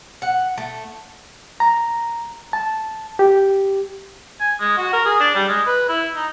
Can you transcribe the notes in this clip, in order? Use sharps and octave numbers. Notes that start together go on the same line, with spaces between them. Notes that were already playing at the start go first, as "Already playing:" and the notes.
F#5
A3
A#5
A5
G4
G#5
G#3
F#4
A#4
G#4
D4
G3
G#3
B4
E4
D#4